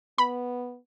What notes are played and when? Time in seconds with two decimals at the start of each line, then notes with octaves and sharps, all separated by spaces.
0.18 B3 B5